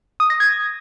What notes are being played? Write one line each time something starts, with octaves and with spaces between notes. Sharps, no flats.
D#6
A#6
G#6